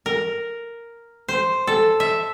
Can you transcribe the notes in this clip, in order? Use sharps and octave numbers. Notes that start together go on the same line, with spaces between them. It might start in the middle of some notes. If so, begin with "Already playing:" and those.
A#4
C5
A4
E5